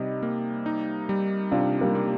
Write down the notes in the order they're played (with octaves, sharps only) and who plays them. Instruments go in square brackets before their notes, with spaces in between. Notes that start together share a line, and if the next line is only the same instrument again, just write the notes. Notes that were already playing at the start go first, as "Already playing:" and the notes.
Already playing: [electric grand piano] C3 G3 D#4 [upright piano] D#5
[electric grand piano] A#3
D#4
G3
[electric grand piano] C3 [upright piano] D4 F4
[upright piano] G3 A#3
[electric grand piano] A#3